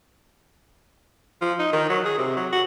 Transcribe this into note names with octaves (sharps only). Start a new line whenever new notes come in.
F3
D#4
D#3
F#3
G#4
C3
F#3
F#4